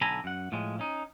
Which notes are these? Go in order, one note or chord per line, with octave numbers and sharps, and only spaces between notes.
B1 D3 A4 G#5 A#5 B5
F#2 F#5
A2 F3 G#3
C#4 D#4